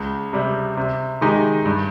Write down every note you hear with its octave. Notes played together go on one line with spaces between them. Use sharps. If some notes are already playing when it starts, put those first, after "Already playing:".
Already playing: C#2
C3 G3
C3
D#3 G#3 D#4 G4
G2